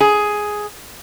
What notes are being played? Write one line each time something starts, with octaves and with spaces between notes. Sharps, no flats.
G#4